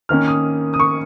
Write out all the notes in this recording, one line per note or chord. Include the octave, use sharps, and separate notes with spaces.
D#3 A#3 C#4 F6
D#6
D#6
C#6